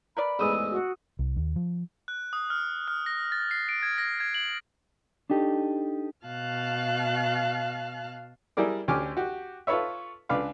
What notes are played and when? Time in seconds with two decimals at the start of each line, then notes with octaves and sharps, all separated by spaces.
0.17 A#4 B4 D5 B5
0.39 A1 E2 G#2 D#6 E6
0.71 F#4
1.19 C2
1.36 D#2
1.56 F3
2.08 F#6
2.33 D#6
2.50 F6
2.88 F6
3.06 A#6
3.32 A6
3.51 C7
3.69 D7
3.83 G#6
3.98 A#6
4.20 G#6
4.34 F#7
5.30 D4 D#4 G4 A4
6.27 B2 F5 A5 F6 F#6
8.57 G3 E4 G#4 A#4 D5
8.88 D2 C#4 G4 G#5 D6 F6
9.17 F#4 G4
9.67 F4 A4 B4 C#5 E5
10.29 C#2 D4 B4 F5 D6